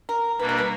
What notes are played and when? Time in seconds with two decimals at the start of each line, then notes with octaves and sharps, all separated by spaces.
0.09 A#4
0.39 B2 G3 A#3 D4 B4
0.49 A#4
0.58 B4